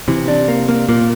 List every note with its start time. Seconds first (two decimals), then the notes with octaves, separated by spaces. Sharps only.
0.08 C3 E3
0.28 D4
0.48 A#3
0.68 A#3
0.89 A#2 A#3